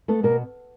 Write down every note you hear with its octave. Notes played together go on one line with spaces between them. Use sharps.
A3 B3 A4
B2 A#3 A#4